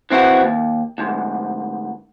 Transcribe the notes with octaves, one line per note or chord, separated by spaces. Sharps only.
E3 C4 E4 F#4
D#2
D2 G#2